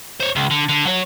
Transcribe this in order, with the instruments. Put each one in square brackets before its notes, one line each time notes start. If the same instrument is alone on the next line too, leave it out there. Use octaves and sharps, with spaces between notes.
[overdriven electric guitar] C5 C#5
C#2
D3
D3
F#3 C#5